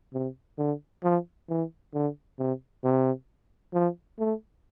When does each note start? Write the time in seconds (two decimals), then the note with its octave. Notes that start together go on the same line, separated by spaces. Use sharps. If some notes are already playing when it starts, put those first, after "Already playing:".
0.14 C3
0.58 D3
1.03 F3
1.49 E3
1.94 D3
2.39 C3
2.84 C3
3.74 F3
4.19 A3